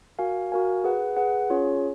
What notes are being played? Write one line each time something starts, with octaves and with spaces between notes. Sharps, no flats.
F#4 A#4 F5 G#5
F#4 A#4 F5 G#5
G#4 B4 F#5
G#4 B4 F#5
C#4 F4 G#4 C#5